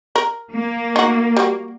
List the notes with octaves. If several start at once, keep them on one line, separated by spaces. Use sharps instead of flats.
A#4
A#3
D#4 F#4
G3 F#4